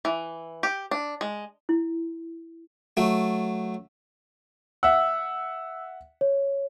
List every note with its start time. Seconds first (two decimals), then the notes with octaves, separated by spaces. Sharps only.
0.05 E3
0.63 G4
0.91 D4
1.21 G#3
1.69 E4
2.97 F#3 A3
4.83 E5 F#5 E6
6.21 C#5